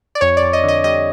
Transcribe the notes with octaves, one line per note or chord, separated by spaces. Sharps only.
D5
F2 C#5
D5
F2
D#5
D3 D#5
G3 D#5